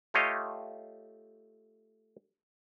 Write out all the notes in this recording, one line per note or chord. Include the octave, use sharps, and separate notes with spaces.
A3 F4 G4 C#5 D#5 F5